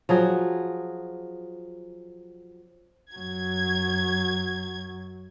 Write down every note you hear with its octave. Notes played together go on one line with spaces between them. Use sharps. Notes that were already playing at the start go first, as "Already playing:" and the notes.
F3 F#3 G#4
F#2 F#3 G#6